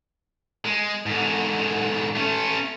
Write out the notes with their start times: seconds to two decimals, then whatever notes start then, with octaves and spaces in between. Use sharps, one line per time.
0.65 G#3
1.06 G#2 D3
2.15 A3 C#4